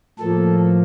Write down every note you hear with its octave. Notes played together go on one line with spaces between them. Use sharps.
A2 F3 A#3 A4